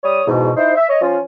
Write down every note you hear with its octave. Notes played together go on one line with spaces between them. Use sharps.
G3 C#5 D#6
E2 G#2 B2
D#4 E4 C5
E5
C#5 D#5
F3 C#4 F4